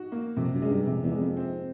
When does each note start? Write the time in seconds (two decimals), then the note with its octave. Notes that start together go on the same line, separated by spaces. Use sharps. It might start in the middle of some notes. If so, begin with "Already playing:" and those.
Already playing: D#4 F#4
0.12 A#3
0.37 F2 C3
0.54 F#2
0.62 G#3
0.70 G2
0.87 F2 C3
1.03 E2
1.12 G#3
1.20 F2
1.37 C4